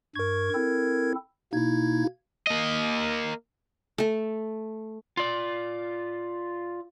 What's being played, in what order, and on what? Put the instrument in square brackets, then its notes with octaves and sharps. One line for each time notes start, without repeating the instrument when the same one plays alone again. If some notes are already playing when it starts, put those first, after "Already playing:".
[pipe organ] G2 C#6 [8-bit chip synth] A#4 G#6
[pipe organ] C4 E4 A4
[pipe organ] B2 A#3 G#6 [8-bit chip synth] D#4 E4
[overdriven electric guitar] A#3 D#5
[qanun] A3 A4
[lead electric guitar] F4 D5